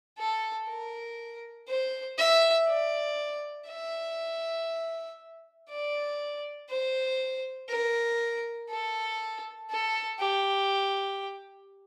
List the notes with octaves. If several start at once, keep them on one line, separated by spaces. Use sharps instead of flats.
A4
A#4
C5
E5
D5
E5
D5
C5
A#4
A4
A4
G4